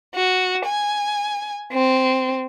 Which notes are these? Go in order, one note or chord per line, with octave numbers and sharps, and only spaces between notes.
F#4
G#5
C4